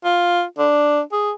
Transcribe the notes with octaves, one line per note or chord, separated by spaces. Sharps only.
F4
D4
G#4